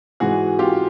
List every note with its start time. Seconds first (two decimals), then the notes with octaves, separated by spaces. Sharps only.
0.20 G#2 E3 F#4 G#4
0.59 F4 G4